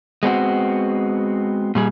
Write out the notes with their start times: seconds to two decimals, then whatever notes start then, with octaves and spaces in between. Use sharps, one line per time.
0.23 G#3 B3 C4 F#4
1.75 A#2 G3 G#4